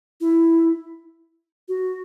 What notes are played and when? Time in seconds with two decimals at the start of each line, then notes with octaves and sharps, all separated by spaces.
0.21 E4
1.68 F#4